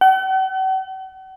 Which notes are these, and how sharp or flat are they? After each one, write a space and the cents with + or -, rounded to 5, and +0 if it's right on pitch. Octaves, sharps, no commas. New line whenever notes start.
F#5 +45